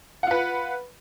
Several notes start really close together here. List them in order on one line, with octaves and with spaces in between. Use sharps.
F#5 F4 B4